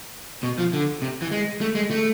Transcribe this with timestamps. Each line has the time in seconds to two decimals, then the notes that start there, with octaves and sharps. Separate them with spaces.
0.43 B2
0.59 F3
0.73 D3
1.02 C3
1.22 E3
1.31 G#3
1.61 A3
1.75 G#3
1.91 A3